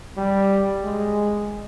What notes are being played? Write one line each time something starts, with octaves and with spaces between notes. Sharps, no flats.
G3
G#3